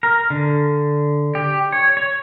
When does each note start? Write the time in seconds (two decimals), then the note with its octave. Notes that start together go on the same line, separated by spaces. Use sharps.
0.03 A#4
0.30 D3
1.35 G4
1.72 C#5
1.97 C#5